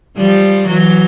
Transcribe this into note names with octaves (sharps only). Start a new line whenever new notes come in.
F3 G3
E3 F#3